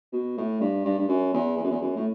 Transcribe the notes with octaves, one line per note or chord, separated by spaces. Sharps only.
B2
A2
G2
G2
G2
F#2
E2
E2
F#2
E2
F#2
A2